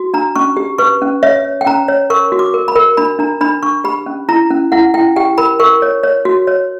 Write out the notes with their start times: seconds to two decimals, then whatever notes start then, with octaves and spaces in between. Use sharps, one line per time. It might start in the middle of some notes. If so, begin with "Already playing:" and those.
Already playing: F#4
0.14 D4 A#5
0.36 C#4 C#6
0.57 G4
0.78 B4 C#6
1.01 C#4
1.23 C#5 E5
1.44 C#5
1.61 G5
1.66 C#4 A#5
1.88 C#5
2.10 A#4 C#6
2.32 F#4
2.39 D6
2.54 A#4
2.68 B5
2.76 A#4
2.97 D4 B5
3.19 D4 A#5
3.41 D4 B5
3.63 D4 C#6
3.84 G4 B5
4.06 C#4
4.29 E4 A#5
4.51 C#4
4.72 E4 F#5
4.94 E4 G5
5.16 G4 G5
5.38 A#4 B5
5.60 A#4 C#6
5.82 C#5
6.03 C#5
6.25 F#4
6.47 C#5